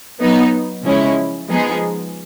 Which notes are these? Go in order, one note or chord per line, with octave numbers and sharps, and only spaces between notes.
F#3 B3 D#4
C#3 F3 G#3 C#4 E4
F3 G#3 B3 D#4 G#4